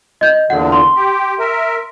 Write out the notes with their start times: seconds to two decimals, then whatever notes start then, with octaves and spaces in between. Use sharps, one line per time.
0.21 D#5 G6
0.50 E2 A#2 D3 F#5
0.72 C6
0.96 G4
1.39 A#4 E5